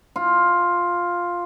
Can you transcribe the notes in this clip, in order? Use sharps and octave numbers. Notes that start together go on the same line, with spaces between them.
F4